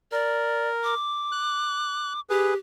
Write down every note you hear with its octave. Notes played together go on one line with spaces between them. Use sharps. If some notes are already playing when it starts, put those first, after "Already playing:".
A#4 D5
D6
F#6
G4 G#4 B4